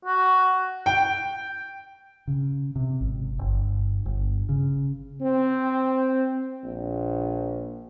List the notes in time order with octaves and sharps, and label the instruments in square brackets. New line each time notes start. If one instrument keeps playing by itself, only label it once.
[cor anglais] F#4
[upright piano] G5
[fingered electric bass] C#3
C3
G#1
G1
G1
C#3
[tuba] C4
A#1